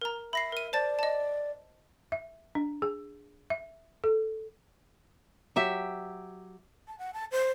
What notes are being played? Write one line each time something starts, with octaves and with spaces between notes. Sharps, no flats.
A#4 A#5
E5 B5 A#6 C7
A#4 D#7
C5 D5 A5 A6
D#5 A5
E5
D4
G#4
E5
A4
F#3 G4 E5
A5
F#5
A5
C5